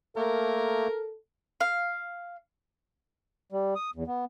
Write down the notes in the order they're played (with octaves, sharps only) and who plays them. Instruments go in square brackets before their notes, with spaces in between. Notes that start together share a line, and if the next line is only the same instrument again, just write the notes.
[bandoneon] A3 A#3 [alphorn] A4 [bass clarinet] A#4
[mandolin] F5
[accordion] G3
D#6
E2
B3